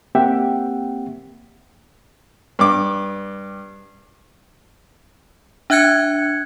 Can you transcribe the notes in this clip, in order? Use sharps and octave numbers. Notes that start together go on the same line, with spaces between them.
A#3 C4 G4 E5 F#5 G5
G2 D6
D4 E5 F#6 G#6 C#7